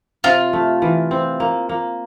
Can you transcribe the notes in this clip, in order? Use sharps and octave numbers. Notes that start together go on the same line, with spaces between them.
C3 F4
A3
E3
C4
A#3
A#3